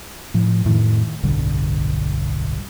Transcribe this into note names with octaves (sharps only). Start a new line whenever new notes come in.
A2 F3
F2 A2 D#3
D1 B1 G2 D3